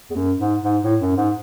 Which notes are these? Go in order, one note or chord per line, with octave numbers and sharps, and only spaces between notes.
E2
F#2
G#2
G#2
A2
F#2
G#2